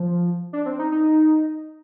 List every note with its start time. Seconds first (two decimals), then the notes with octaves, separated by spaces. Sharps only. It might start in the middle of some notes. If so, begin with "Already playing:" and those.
Already playing: F3
0.53 D4
0.66 C4
0.79 D#4
0.92 D#4